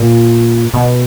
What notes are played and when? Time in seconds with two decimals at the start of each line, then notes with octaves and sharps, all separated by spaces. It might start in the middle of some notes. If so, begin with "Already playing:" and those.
Already playing: A#2
0.74 B2